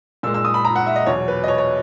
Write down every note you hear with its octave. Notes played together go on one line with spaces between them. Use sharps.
A#2 G#3 E6
E6
D#6
B5
A#5
F#5
E5
D#5
E2 B2 F#3 C#5
B4
D#5
C#5
C#5